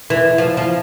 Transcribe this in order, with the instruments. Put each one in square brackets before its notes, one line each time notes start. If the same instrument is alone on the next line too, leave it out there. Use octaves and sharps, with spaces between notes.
[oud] E3
F3
F3